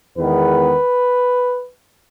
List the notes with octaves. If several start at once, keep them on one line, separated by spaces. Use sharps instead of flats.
E2 D#3 G#3 B3 B4